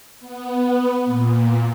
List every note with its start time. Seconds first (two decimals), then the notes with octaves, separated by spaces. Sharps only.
0.20 B3
1.05 A#2